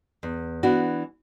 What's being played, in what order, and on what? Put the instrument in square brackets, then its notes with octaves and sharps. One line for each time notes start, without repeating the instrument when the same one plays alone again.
[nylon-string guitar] E2
E3 B3 D4 F#4